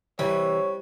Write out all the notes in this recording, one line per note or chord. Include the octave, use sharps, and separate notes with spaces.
C3 E3 G3 C#5